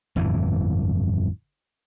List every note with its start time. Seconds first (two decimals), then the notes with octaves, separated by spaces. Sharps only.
0.16 G1 F2 A2 E3